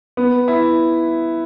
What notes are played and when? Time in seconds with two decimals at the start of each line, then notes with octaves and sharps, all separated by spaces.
0.17 B3
0.48 E4